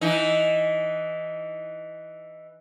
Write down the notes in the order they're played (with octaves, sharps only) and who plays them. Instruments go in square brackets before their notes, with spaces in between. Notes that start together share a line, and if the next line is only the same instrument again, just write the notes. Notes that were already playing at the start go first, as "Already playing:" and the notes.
[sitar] E3 D#4